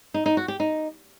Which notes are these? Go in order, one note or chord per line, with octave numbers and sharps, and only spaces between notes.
D#4
D#4
F#4
G4
D#4